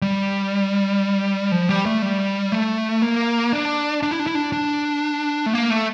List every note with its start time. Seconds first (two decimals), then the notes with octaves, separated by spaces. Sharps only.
0.02 G3
1.51 F3
1.69 G3
1.86 A3
2.02 G3
2.52 A3
3.02 A#3
3.53 D4
4.03 D4
4.11 E4
4.19 D4
4.27 E4
4.35 D4
4.52 D4
5.46 A3
5.54 A#3
5.70 A3